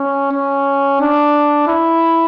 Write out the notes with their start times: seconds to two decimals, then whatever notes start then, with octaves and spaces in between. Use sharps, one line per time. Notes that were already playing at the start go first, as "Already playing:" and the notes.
Already playing: C#4
0.32 C#4
1.01 D4
1.67 E4